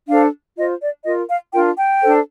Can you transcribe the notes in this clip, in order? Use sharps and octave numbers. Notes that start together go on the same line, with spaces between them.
D4 A4 C5 F5
F4 C5 D#5
D5
F4 A#4 D#5
F5
D4 F4 A#4 G5
G5
D4 A4 C5